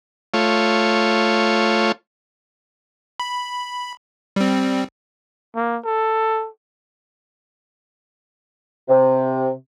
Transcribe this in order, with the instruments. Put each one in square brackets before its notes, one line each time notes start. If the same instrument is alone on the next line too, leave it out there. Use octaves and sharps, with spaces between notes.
[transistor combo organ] A3 F4 C#5
[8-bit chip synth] B5
G3 C4
[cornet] A#3
A4
[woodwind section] C3